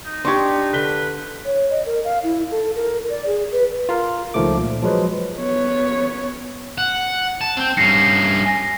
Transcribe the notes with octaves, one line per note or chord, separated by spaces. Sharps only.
D#4
D4 G4 C6 C#6 G#6
D3 B4 B6 G7
C#5
D#5
A#4
F5
E4
A4
A#4
D5
G#4
B4
F4 A#4
C#2 D#3 F3 A3 D6
A#2
F3 F#3 G#3 B4
B3 C#5
F#5
A5
C4 G5
G2 C#4 A#6 C7 C#7
G#5 A#6